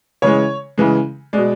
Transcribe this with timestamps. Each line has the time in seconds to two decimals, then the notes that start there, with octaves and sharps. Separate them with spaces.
0.22 C#3 E3 G#3 C#5
0.78 C#3 E3 G#3
1.33 B2 G#3 D5